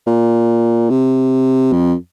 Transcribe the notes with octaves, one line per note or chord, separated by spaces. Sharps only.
A#2
C3
F2